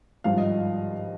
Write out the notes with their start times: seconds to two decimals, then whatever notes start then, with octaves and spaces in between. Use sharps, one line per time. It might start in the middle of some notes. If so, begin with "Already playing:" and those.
0.24 G#1 G2 F3 F5
0.38 D#5